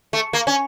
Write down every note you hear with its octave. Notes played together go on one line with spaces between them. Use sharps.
A3
A#3
C#4